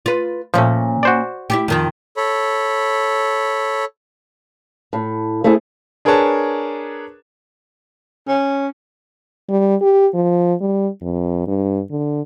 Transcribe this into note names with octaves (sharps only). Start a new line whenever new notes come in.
F4 B4
A#2 F3 A3 C#4
F#4 C5 D5
E4 F4 G4
F2 D#3 F4
A4 C#5 B5
A2
A3 C4 E4 G#4
D4 G#4 A#4 B4 C#5 A5
C#4
G3
G4
F3
G3
F2
G2
D3